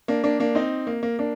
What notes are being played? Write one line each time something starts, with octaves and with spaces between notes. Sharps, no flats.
A#3 D4
A#3 D4
A#3 D4
C4 D#4
A#3
A#3
A#3 D4